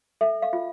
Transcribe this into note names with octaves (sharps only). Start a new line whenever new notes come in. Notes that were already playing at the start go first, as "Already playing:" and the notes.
A4 E5
F5
F4